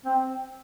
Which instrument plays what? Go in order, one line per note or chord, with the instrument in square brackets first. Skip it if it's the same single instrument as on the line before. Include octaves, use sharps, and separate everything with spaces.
[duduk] C4